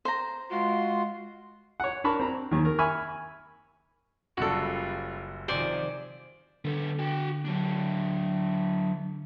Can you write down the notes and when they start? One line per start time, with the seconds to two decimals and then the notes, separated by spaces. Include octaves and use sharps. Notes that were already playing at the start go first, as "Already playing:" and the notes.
0.05 C5 A#5
0.51 G#3 F4 F#4 C6
1.80 C#5 F#5
2.04 D4 A#4 A5 B5 C#6
2.20 C4 A#5
2.51 D#2 D#3
2.65 A#4
2.79 E5 G#5 B5 C#6 F6
4.37 F#1 F#2 G3 F4 F#4 A4
5.48 C3 D#3 F3 C5 D5 G#5
6.65 D3 B3 A4
6.99 F#4 G5
7.45 F#3 D4